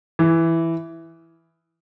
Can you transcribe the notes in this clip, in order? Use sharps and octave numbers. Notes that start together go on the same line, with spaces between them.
E3